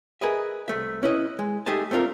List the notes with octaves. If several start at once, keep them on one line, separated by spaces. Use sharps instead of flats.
G#4 A#4 B4 D#5 E5
C2 A3 E5
C#4 E4 B4 D#5
G#3
A3 D#4 G4 G#4 D#5 A5
A3 C4 D4 F4 A#4